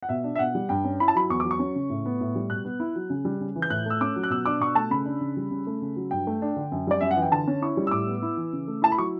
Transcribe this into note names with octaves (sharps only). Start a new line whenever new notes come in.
F#5
B2 E5
D4
E5
B2 F#5
G3
G2 G5
C#4
E4 B5
A5
F#3 B5
E2 C#6
F#3 D6
C#6
C#4
C#3
A2
B3
A2
G3
B2 F#6
B3
E4
F#3
C#3
G3
C#3
E3
G6
A2 F#6
A3 E6
C#4 D6
F#3
F#6
B2 E6
D4 D6
B2 C#6
A3 A5
C#3 B5
D4
C#3
G3
C#3
A3
C#3
F#3
G2 G5
A3
D4
D3
F#2
G3 D5
F#2 E5
F#5
E3
G5
D3 A5
C#4
E4 C#6
G3
E6
A2 D6
B3
E4
E3
C#3
A3
E4 A5
B5
F#3 C#6